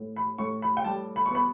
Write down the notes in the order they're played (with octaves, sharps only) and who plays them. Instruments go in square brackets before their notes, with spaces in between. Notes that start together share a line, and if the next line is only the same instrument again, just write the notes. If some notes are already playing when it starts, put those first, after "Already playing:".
Already playing: [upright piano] A2
B5
A2 C#6
B5
G5
G3 A5
B5
C#6
B3 B5